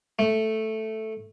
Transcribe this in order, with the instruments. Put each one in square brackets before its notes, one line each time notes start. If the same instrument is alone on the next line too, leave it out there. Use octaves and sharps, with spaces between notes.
[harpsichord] A3